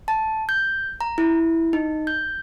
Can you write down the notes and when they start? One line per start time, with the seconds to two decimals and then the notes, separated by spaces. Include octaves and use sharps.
0.08 A5
0.49 G6
1.01 A#5
1.18 E4
1.73 D#4
2.07 G6